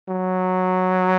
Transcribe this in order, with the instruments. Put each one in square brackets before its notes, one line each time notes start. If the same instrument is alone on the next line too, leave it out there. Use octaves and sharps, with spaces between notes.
[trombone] F#3